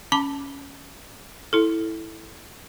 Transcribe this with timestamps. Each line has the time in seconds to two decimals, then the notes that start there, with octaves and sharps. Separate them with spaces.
0.12 C#4 A5 B5 D6
1.53 E4 A4